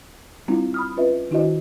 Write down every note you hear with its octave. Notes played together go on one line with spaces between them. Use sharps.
G3 C4 D4 E4 F4
B5 D#6 F6
C#4 F4 B4 D#5 E5
D#3 D4 E4 F#4 C5 D#5